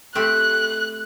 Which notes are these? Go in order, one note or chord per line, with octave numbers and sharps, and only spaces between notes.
A3 C4 G4 F#6